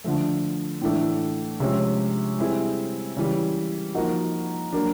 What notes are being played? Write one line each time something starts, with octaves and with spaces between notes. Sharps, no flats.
D3 F3 A3
A2 E3 A3 D4
C3 F3 G#3 C#4
G3 C4 E4 G#4
C#3 E3 G3
F3 A#3 D#4 F#4
F#3 A#3 D4